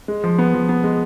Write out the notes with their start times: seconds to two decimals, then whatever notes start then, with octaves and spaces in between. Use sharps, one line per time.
0.08 G#3
0.24 F3
0.38 B3
0.54 F3
0.69 B3
0.84 G#3